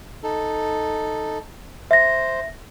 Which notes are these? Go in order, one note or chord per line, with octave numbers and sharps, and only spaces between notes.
D#4 A4
C5 E5 A#6